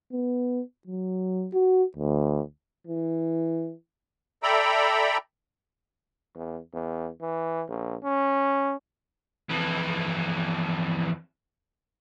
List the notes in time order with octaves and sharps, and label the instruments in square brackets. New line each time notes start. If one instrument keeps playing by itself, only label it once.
[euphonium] B3
F#3
F#4
D2
[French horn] E3
[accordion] A4 D5 E5 G5 A#5 B5
[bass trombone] E2
E2
E3
A#1
C#4
[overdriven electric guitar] F2 E3